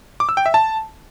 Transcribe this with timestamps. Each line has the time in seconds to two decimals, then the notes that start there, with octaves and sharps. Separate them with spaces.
0.20 D6
0.29 E6
0.37 G5
0.46 E5
0.54 A5